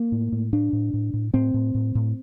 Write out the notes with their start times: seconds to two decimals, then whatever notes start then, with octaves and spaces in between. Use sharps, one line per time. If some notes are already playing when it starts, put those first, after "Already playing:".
Already playing: A#3
0.12 A2
0.32 A2
0.53 A2 D4
0.73 A2
0.94 A2
1.14 A2
1.34 A2 C4
1.54 A2
1.75 A2
1.95 A2